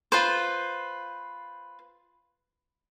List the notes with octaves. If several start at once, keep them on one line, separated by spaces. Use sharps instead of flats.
F4 B4 C5